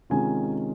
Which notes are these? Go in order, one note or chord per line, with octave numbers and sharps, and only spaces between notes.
C3 D#3 G#3 C#4 F4 G#5